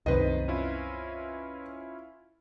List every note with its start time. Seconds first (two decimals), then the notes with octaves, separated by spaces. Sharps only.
0.06 C2 F#2 C3 D#3 B4 C5 D#5
0.48 C#4 E4 F4